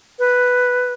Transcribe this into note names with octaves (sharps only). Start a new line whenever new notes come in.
B4